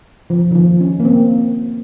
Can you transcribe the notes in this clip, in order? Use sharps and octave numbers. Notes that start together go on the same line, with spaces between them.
F3
D#3
F3
C#4
A#3
C4